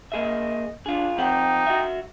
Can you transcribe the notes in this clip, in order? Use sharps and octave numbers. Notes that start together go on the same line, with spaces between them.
A#3 G#4 D#5 E5
D4 F4 G#4
F2 C4 D#4 F#5 G5
F#4 E5